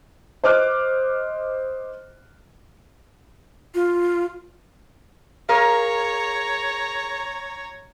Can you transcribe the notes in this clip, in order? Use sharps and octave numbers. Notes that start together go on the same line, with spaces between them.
C5 D#5 D6 F6 F#6
F4
G#4 A#4 C#5 F5 A#5